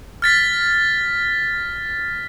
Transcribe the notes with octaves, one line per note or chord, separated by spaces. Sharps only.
F6 A6 B6